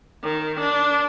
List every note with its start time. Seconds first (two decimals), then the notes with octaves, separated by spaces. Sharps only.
0.23 D#3
0.60 D4